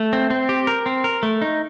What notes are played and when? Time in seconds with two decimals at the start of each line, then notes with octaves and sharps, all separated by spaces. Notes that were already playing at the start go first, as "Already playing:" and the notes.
Already playing: A3
0.13 C4
0.30 C4
0.49 G4
0.67 A#4
0.86 C4
1.04 A#4
1.23 A3
1.42 D#4